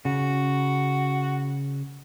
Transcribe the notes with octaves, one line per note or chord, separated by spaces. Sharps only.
C#3 F#4